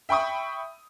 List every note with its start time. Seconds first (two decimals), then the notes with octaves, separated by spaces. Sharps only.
0.09 E5 G5 B5 C#6 D#6